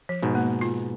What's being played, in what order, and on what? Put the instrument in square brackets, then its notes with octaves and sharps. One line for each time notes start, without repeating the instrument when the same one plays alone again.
[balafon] F3
[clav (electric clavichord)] G#2 B2
[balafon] A#3
F4